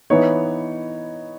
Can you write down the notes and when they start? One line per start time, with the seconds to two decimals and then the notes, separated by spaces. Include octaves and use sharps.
0.10 E3 B3 D#4 C#5